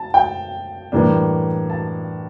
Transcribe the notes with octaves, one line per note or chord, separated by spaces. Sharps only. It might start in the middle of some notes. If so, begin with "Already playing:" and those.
Already playing: A5
G5
A2 E3 G3 A#3 D4
A5